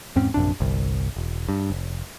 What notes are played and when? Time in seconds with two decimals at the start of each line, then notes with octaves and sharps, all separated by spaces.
0.16 E2 G#2 C4 C#4
0.34 A#1 F#2 C3 D4
0.60 G1 C2
1.16 E1
1.49 G2
1.70 F1